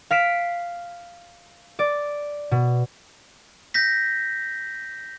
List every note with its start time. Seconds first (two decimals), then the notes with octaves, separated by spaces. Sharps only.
0.11 F5 B6 D7 E7
1.79 D5
2.51 B2
3.74 G6 A#6 B6